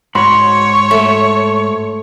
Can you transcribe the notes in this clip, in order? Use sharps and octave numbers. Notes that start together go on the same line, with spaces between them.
G#2 F#4 C#5 B5 C6
A3